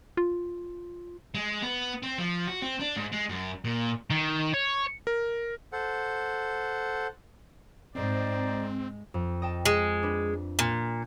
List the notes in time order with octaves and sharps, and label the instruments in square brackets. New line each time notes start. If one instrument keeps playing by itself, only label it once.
[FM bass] F4
[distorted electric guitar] G#3
B3
C4
F3
F#4
C4
D4
G#2
G#3
F#2
A#2
D#3
C#5
[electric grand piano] A#4
[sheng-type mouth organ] A4 C5 F#5
[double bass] G#2 [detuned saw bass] C4 [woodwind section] D#4 C5 D5
[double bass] G#3
[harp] F2
D#5 G5 A5
[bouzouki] G#3
[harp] D4 B4
[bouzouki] A#2 [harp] F#6